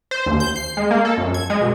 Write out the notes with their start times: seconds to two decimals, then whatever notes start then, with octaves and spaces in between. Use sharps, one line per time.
0.11 C5
0.26 D#2
0.40 G6
0.56 C7
0.77 G#3
0.91 A#3
1.05 A4
1.17 F#2
1.34 G#6
1.50 G#3
1.61 B2